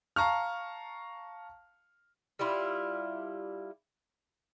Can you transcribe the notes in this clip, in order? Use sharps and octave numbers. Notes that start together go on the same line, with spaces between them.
F5 A5 A#5 C#6 F6
G3 D4 E4 F4